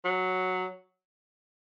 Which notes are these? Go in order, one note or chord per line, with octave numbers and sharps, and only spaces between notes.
F#3